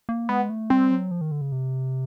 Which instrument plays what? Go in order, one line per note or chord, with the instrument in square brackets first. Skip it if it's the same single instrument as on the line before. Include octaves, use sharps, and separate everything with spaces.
[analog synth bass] A#3
[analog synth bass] G#3 [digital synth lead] B3
[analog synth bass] A3
[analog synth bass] G3 [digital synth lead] C4
[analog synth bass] F#3
F3
D#3
D3
C#3
C3